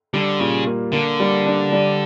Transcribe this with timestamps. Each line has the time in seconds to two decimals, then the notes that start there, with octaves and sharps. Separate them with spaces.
0.14 D3 G3
0.40 A#2 C#3
0.67 A#3
0.93 D3 A#3
1.20 G3
1.46 D4
1.72 G3